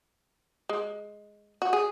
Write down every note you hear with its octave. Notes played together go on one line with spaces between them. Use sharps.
G#3
F#4
G#4